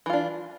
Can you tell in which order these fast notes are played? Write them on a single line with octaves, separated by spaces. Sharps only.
E3 F4 D4